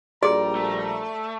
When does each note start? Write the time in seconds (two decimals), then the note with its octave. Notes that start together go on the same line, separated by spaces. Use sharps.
0.23 A#1 G3 F#4 G#4 D5 A#5
0.55 A3